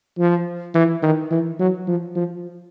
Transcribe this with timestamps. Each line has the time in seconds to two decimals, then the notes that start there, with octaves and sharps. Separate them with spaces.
0.18 F3
0.75 E3
1.03 D#3
1.31 E3
1.59 F#3
1.87 F3
2.15 F3